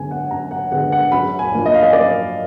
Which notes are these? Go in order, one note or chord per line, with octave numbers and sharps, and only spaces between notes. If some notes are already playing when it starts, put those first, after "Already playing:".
Already playing: F#2 D3 G#3 B3 G#5
F#5
F#2 A#5
F#5
D3 G#3 B3 F#5
F#5
F#2 B5
G#5
F3 A#3 D4
D#5
F5
D#5
F#2 D5